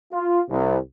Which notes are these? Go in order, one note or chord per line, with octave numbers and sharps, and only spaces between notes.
F4
C2